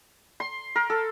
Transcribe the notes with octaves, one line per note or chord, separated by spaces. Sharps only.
C6
A#4
A4